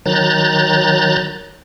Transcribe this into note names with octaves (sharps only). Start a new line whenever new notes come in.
D#3 F#3 A#5 F#6 G6 A6